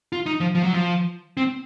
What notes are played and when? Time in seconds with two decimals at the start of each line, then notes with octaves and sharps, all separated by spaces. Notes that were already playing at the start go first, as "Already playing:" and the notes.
0.12 F4
0.26 D#4
0.40 F3
0.55 F3
0.63 F#3
0.74 F3
1.37 C4